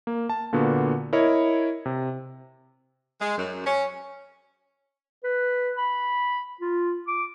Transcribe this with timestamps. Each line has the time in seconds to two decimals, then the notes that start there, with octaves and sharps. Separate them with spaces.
0.07 A#3
0.29 A5
0.53 A#2 D3 A#3 B3 F#4
1.13 E4 A#4 C#5 D#5
1.86 C3
3.21 G#3
3.38 F#2
3.66 C#4
5.24 B4
5.77 B5
6.61 F4
7.08 D6